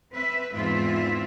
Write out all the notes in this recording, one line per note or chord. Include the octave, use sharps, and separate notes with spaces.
C4 B4 E5
E2 G#2 E3 C4 F4 E5